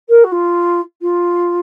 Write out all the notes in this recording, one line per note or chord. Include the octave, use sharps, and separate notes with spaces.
A#4
F#4
F4
F4